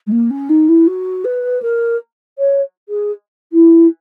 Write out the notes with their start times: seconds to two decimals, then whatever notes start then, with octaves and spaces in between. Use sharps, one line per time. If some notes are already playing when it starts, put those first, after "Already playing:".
0.07 G#3
0.12 A#3
0.30 C#4
0.49 D#4
0.68 E4
0.87 F#4
1.24 B4
1.62 A#4
2.38 C#5
2.89 G#4
3.52 E4